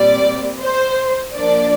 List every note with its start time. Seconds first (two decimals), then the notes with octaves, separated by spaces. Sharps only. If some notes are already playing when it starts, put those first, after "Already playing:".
Already playing: A#2 G3 C4 D5
0.60 C5
1.35 F3 A#3 D4 D5